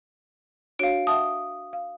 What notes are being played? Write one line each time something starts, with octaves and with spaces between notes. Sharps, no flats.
D4 F#4 C#5 F5 D7
E5 F#5 A5 D#6
F5